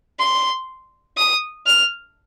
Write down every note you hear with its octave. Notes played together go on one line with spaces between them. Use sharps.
C6
D#6
F6